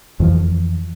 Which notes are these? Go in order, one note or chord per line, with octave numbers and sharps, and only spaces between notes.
F2 E3 F3